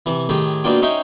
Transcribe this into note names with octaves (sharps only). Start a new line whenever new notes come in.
C3 E3
A2 D#3 G4 G#4
B2 G#3 A#3 D4 F4 G5
C#4 D#4 C5 E5 G5